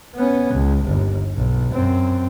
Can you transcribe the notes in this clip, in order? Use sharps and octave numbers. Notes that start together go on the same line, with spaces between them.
B3 C#4
C#2
G1 D#2
B1
F#2 C4